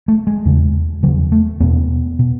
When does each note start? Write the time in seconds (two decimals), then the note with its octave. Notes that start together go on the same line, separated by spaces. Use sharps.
0.08 A3
0.27 G#3
0.45 E2 C#3
1.03 C#3 F#3
1.07 E2
1.32 A3
1.60 E2 B2 B3
2.19 B2